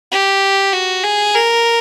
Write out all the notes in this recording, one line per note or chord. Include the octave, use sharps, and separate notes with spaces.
G4
F#4
G#4
A#4